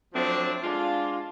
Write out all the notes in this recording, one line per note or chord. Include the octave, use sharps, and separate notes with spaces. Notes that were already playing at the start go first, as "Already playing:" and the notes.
F3 F#3 A3 C4 D4
G#3 D4 F4